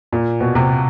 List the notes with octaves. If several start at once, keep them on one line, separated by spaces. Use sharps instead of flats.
A#2
B2
C3